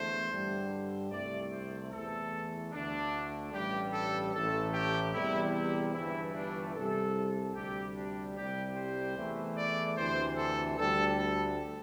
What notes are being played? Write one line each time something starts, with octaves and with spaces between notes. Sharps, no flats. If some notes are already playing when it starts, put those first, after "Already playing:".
Already playing: E2 D3 A3 C5
G2 D3 G3
C2 C3 A3 D5
C5
E2 E3 A3 A4
D2 D3 A3 D4
A1 G2 G3 G4
A4
A1 A2 A3 A4
G4
E2 C3 G3 E4
E4
G1 G2 E3 A3 E4
D4
C2 C3 G3 A4
D2 C3 G3 G4
D4
C2 C3 G3 G4
C5
E2 E3 A3
D5
D2 C3 E3 C5
A4
D2 D3 G3 A4
A4